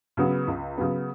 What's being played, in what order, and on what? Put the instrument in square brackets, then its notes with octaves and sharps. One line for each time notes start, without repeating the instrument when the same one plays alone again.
[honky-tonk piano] C#3 F#3 B3
C#2
C#3 F#3 B3